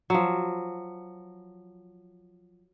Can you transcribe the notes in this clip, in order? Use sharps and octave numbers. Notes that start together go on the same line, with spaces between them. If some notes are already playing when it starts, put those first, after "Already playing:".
F3 F#3